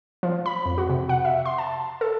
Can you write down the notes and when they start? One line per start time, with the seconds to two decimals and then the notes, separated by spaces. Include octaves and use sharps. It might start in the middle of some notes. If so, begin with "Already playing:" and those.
0.23 F3
0.46 B5
0.66 F2
0.78 F#4
0.90 C3
1.09 F#5
1.25 E5
1.46 C6
1.58 A5
2.01 A4